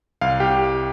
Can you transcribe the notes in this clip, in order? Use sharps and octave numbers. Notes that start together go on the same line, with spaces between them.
C2 F5
G4